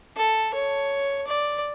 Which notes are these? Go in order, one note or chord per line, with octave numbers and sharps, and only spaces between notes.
A4
C#5
D5